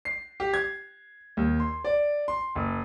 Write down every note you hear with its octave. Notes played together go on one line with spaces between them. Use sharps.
C7
G4
G#6
D#2
C6
D5
C6
F#1